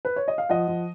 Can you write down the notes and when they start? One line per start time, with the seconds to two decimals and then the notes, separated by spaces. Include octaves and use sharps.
0.05 B4
0.16 C#5
0.28 D#5
0.38 F5
0.49 F3 D#5 F#5
0.68 F3